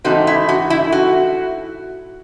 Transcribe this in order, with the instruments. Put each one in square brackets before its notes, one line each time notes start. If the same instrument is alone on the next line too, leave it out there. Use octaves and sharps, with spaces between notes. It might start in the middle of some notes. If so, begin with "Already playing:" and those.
[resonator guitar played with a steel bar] G#2 E3 A3 C4 D#4 F#4
E4
F#4
E4
F#4